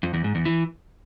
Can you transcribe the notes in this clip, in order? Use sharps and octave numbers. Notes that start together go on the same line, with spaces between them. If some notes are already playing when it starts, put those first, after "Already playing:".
F2
E2
G#2
E2
E3